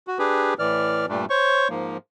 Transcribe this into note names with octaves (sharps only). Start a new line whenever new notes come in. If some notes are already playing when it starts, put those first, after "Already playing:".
F#4
D4 G4 G#4 B4
A2 E3 D5 F6
G2 A#2 G3 A3 D4
C5 C#5 C#6
G#2 F3 A#3